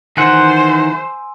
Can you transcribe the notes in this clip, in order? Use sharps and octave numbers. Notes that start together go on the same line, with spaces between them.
D#3 E3 C5 F#5 G#5 C6 E6